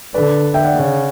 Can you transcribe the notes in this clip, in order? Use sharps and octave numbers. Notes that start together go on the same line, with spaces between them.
D3 B4 D5
E5 G5
D5 F#5
C#3